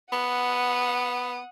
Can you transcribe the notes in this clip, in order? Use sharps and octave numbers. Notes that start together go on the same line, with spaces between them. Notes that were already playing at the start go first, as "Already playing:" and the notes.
B3 F#5 D#6